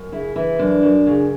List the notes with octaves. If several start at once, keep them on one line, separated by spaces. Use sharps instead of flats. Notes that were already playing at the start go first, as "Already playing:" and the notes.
Already playing: F#2
C#3 E4
E3 E4
F#2 D4
F#2
C#3